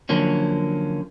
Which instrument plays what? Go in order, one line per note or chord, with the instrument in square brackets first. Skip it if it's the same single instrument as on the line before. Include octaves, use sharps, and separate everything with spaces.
[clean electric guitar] D3 F3 F#3 A#3 C#4